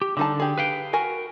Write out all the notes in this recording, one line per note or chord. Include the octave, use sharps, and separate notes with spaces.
G4
D3 G3 D#4 A5
G4 G#4
B4 F5 G5
F#4 A#4 G#5